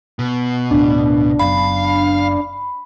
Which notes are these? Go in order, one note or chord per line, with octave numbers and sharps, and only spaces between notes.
B2
D1 D2 A2 D4
F#1 F#2 B3 F5 B5